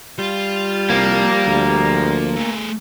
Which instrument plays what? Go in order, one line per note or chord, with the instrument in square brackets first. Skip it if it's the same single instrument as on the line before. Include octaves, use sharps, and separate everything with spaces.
[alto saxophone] G3 [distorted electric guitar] F4
[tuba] C2 [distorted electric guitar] F3 [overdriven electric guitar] A#3
[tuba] D2
[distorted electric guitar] A3 G#4